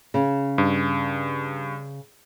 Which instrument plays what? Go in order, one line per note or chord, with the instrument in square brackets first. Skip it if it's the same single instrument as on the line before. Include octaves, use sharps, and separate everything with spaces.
[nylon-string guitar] C#3
[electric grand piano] G2